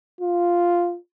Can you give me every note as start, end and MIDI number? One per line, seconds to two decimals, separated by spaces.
0.21 0.97 65